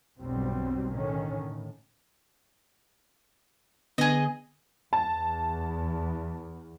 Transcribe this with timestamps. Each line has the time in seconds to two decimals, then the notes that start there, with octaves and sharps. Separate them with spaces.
0.19 B1 E2 G2 F#3 G3 C4
0.91 A2 D3 D#3 C#4
1.40 A2
3.98 D3 B3 G#4 D#5
4.93 E2 A5